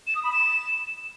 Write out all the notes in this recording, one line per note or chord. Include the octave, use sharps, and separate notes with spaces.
E7
D#6
B5
E7